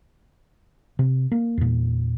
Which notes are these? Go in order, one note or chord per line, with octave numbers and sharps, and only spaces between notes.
C3
A#3
E2 A#2